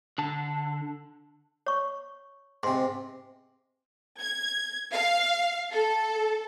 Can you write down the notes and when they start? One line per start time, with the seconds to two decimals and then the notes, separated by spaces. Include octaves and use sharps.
0.18 D3 A5
1.66 C#5 C#6
2.63 G#2 C3 C6
4.20 G#6
4.92 F5
5.72 A4